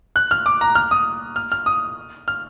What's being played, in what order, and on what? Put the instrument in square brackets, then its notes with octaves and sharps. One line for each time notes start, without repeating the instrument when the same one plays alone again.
[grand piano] F#6
F6
D6
A#5
F6
D#6
F6
F6
D#6
F6